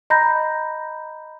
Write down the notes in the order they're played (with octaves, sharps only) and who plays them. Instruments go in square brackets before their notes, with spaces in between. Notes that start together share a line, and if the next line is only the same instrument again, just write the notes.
[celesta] D#5 A#5 B5 G6 A#6